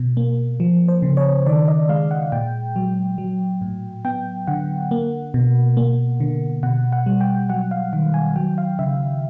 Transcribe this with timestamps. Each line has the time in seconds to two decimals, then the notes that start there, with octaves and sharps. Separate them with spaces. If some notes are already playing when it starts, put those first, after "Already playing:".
Already playing: B2
0.17 A#3
0.60 F3
0.88 C5
1.02 C#3
1.17 C#5
1.46 D#3 D5
1.68 D#5
1.89 G#3 F5
2.11 F#5
2.32 A#2 G5
2.76 F#3
3.18 F#3
3.61 A2
4.05 B3 G5
4.47 D3 F#5
4.91 A#3
5.34 B2
5.77 A#3
6.20 D3
6.63 B2 F#5
6.92 F#5
7.06 G3
7.21 G5
7.50 F#3 F#5
7.71 F5
7.93 D#3 F#5
8.14 G#5
8.36 F#3 G5
8.58 F5
8.79 C#3 E5